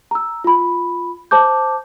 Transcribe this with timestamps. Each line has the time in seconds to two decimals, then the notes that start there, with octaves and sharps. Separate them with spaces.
0.11 A#5 E6
0.44 F4 B5
1.31 C5 A5 D6 G6